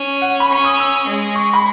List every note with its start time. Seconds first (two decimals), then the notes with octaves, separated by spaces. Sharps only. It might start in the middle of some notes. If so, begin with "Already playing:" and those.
Already playing: C#4
0.22 F#5
0.40 B5
0.49 C#4 C#6
0.64 D#6
0.79 E6
1.07 G#3
1.35 C#6
1.53 B5